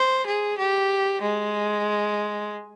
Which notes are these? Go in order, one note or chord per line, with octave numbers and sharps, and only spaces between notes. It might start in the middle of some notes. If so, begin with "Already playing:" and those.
Already playing: C5
G#4
G4
G#3